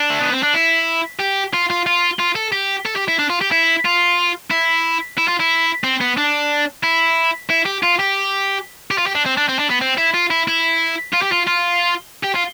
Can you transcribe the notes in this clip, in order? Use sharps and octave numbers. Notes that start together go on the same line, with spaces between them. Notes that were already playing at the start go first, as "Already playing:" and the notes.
Already playing: D4
A3
B3
C4
D4
E4
G4
F4
F4
F4
F4
A4
G4
A4
G4
E4
D4
F4
G4
E4
F4
E4
E4
F4
E4
C4
B3
D4
E4
E4
G4
F4
G4
G4
F4
G4
D4
C4
D4
C4
D4
B3
C4
E4
F4
E4
E4
F4
G4
F4
F4
G4
F4